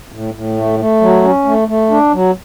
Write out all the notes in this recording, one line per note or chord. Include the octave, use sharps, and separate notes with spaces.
A2
A2
A3
A3
F#3
C#4
A3
A3
D4
F#3